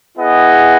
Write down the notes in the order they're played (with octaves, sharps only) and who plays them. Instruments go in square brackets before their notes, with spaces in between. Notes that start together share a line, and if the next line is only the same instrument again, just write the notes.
[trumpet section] B3 E4 G#4 D#5 F#5